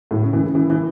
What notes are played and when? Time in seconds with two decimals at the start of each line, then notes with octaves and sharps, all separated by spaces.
0.11 A2
0.22 C#3
0.33 E3
0.44 C#3
0.55 E3
0.70 E3